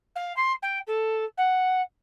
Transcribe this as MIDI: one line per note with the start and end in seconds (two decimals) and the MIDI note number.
0.16 0.35 77
0.36 0.52 84
0.62 0.79 79
0.87 1.25 69
1.37 1.81 78